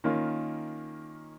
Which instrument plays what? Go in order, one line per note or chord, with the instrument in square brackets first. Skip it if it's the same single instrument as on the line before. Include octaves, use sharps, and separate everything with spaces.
[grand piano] D#3 A#3 C#4 F4